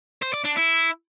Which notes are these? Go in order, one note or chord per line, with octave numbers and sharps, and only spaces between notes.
C5
D5
D4
E4